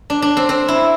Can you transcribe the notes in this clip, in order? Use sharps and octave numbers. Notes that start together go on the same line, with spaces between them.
D4
D4
C4
C4
E4